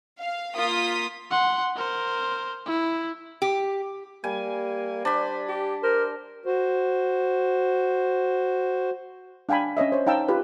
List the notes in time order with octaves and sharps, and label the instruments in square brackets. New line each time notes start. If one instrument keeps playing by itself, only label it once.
[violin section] F5
A#3 F4 D#6 B6
[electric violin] F#5 C6
A#4 C5
E4
[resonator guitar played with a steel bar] G4
[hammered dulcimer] G3 [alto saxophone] A#3 [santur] G#5
[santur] D4 B5 [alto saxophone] C5
[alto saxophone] G4
[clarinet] A#4 [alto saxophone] C5
[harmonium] F#4 C5
[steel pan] D4 F5 G5 G#5 B5
C#4 C#5 D#5 E5
C5 C#5
D#4 F5 G5 A5 E6
F4 G4 B4